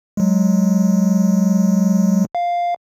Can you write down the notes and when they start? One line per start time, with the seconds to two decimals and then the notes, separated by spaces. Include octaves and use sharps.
0.17 F#3 G#3
2.35 F5